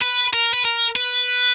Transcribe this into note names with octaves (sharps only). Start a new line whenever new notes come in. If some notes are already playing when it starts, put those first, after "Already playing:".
B4
A#4
B4
A#4
B4